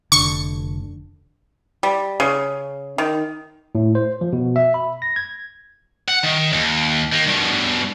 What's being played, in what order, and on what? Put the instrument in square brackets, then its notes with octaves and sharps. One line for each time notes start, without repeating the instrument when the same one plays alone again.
[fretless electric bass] F1 D3 [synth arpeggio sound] C#6
[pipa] G3
C#3
D#3
[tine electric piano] A2
C5
F3
B2
E5
B5
A#6
G#6
[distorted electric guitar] F#5
D#3
D#2
D#3 A#3
G2 B2